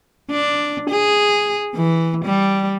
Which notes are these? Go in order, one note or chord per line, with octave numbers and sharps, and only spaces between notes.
D4
G#4
E3
G3